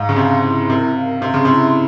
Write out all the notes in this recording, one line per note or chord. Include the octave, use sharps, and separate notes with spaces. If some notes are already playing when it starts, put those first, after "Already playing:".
Already playing: G#2 F5
C#3
C3 C6
E4
C3 A#4
F5
C3 C6
C#3
C3 E4